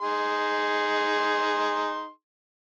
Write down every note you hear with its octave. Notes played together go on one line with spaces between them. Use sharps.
D#4 G#4 C6